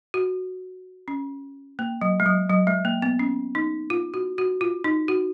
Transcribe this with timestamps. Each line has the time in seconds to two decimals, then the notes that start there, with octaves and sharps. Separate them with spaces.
0.14 F#4
1.08 C#4
1.79 A#3
2.01 F#3
2.20 G#3
2.26 F#3
2.50 F#3
2.67 G#3
2.85 A#3
3.02 B3
3.19 C#4
3.55 D#4
3.90 F4
4.14 F#4
4.38 F#4
4.61 F4
4.84 D#4
5.08 F#4